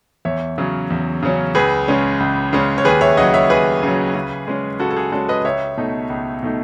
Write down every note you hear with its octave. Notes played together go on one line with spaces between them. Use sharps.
E2 C#5 E5
C#3 F#3 C#4
E2
C#3 F#3 C#4
C#2 G#4 B4
C#3 G#3 C#4
C#2
C#3 G#3 C#4
C#5
D#2 G#4 B4
C#5 E5
C#3 F#3 D#5 F#5
C#5 E5
D#2 G#4 B4
C#3 F#3
C#3
G#3 C#4
C#3 F#4 A4
A4
G#4
G#3 C#4 F#4 A4
B4 D#5
C#2 C#5 E5
B2 A3 D#4
C#2
B2 A3 D#4